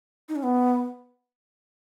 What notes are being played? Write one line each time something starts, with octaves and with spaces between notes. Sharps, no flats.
D#4
C#4
B3